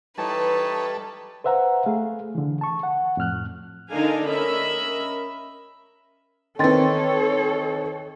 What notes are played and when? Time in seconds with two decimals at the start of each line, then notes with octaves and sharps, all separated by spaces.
0.18 E3 G3 D#4 A4 B4 C#5 A5
1.44 B4 C5 E5 F#5 A#5
1.86 A3 G#4 F5
2.35 D3 E3
2.61 A5 C#6
2.83 F#5
3.17 F2 A2 F6 F#6
3.90 D3 D4 D#4 A#4 F5 G#5
4.28 C#4 A#4 D#5 E5 B5
6.59 D#3 E3 C4 A4 C#5 G5 C6 A6